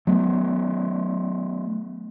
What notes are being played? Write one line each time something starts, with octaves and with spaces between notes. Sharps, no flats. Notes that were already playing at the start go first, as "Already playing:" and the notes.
F#3 A3 B3